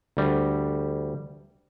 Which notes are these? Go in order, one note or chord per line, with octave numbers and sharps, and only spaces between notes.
D2 G3